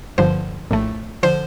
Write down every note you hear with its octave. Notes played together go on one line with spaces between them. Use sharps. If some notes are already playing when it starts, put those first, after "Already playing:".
G1 G2 D3 F3 C5
A#1 A2 A3
D3 F3 C5